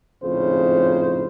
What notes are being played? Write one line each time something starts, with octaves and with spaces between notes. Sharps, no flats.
G#1 F2 A2 C#3 C5